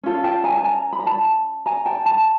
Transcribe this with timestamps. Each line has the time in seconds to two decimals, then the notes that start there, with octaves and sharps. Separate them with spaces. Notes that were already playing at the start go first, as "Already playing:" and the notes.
0.03 C#4 F4 A4
0.24 G5 A5
0.44 G#5 A#5
0.57 A5
0.64 G#5 A#5
0.93 B5
0.99 A#5
1.06 A5 B5
1.66 G#5 A#5
1.86 G5 A5
2.06 A5 B5